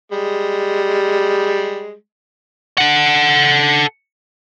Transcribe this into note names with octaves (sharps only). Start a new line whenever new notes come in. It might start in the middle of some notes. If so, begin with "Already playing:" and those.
G3 G#3
A4 F#5